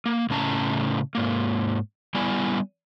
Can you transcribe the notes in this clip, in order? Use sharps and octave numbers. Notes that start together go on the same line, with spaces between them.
A#3
A2 C#3 C#4 A5 A#5
G#2 A#3
G3 B3 E4 D5 G#5